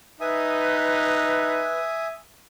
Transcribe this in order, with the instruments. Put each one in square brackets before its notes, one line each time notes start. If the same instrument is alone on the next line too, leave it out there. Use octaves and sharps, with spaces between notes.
[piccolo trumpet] D#4 [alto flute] B4 [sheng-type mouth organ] E5 G#5 D#6